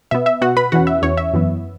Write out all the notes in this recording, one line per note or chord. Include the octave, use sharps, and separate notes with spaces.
B2 B3 E5
E5
B2 B3 F#4 F#5
B4 B5
E2 E3 C#4 F#4 F#5
E5
E2 E3 C#4 C#5
E5
F#2 E3 B3